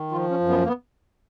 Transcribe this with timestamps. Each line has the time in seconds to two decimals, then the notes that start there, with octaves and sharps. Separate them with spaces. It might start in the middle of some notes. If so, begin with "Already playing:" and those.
Already playing: D#3
0.11 F3 F4
0.30 C#4
0.40 F#2
0.49 B3
0.63 A#3
0.67 B3